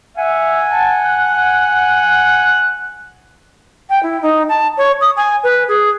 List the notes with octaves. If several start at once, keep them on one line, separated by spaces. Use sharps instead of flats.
E5 F#5 G#5
A5
F#6
G5
E4
D#4
A5
C#5
D#6
G#5
B4
G#4